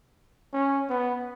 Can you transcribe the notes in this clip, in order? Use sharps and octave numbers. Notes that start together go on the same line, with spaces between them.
C#4
B3